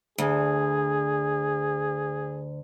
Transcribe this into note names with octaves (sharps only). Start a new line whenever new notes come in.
D2 G#4